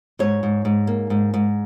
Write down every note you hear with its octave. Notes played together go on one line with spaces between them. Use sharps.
G#2 C#5
G#2
G#2
A#3
G#2
G#2